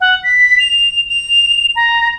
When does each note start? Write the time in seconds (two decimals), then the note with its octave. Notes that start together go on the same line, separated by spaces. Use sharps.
0.01 F#5
0.23 B6
0.59 F7
1.09 F7
1.75 A#5